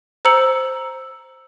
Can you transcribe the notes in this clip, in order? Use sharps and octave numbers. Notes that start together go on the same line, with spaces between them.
C5 A#5 E6 C#7 F#7